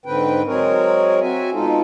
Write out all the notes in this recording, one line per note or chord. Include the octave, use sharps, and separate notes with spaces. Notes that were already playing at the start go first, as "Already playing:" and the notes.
G#2 D3 C4 B4 G5
F#3 G#3 C4 G#4 A#4 C#5
C4 F#4 E5 G#5
B2 G#3 D#4 F4 A4